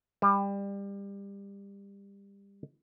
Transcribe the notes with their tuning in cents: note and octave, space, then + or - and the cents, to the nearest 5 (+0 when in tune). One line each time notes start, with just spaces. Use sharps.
G3 +25